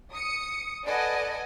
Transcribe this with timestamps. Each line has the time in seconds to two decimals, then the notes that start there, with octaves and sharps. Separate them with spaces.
0.13 D#6 C#7
0.87 A4 B4 D5 D#5 F#5 G#5